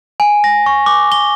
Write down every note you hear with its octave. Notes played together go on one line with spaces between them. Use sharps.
G#5
A#6
C#6
D6
G7